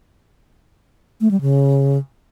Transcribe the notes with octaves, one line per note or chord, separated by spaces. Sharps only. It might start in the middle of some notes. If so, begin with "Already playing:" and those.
A3
G3
C#3